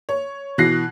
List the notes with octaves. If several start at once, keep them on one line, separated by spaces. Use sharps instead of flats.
C#5
B2 E3 F#6 A#6 C7